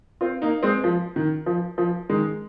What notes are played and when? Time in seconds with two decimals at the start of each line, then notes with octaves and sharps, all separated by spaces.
0.21 C4 F4
0.42 A#3 D#4
0.63 G#3 C4
0.84 F3
1.16 D#3
1.46 F3
1.78 F3
2.09 D#3 G#3